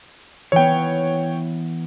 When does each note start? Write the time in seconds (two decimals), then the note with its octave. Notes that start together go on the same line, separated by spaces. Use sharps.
0.52 E3 B3 C#5 G5